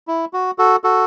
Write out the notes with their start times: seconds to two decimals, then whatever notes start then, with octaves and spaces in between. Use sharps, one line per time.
0.08 E4
0.33 F#4
0.59 F#4 A4
0.84 F#4 A4